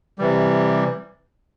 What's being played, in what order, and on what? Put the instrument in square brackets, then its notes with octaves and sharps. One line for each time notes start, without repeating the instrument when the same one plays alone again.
[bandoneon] C3 E3 G3